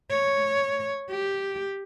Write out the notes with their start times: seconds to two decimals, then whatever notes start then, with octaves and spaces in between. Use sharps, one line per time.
0.11 C#5
1.11 G4